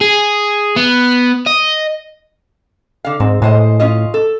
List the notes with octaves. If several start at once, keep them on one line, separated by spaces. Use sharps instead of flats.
G#4
B3
D#5
D3 F5
G#2 C4
A2 G#3 C5 D#5
C#4 F4 D#5
A4